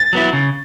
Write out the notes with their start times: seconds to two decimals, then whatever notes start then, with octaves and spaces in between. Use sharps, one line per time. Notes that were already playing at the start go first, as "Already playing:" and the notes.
Already playing: A6
0.13 F#3 B3 E4
0.33 C#3